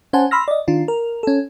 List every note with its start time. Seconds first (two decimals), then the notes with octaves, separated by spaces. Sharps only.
0.13 C#4 C5 F#5 G#5 A5
0.31 B5 C6 E6 F6 A#6
0.48 D5 D#5
0.68 D#3 D4 F4
0.88 A#4
1.23 C#4 A4